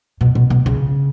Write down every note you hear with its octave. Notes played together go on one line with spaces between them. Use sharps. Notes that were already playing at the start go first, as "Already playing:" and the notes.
B2
B2
B2
C#3